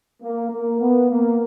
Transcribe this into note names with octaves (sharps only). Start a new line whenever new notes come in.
A#3
A#3
B3
A#3